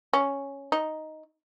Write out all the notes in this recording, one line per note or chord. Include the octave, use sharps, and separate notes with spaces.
C#4
D#4